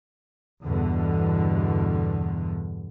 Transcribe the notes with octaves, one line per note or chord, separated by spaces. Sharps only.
E2 G2 B2 D3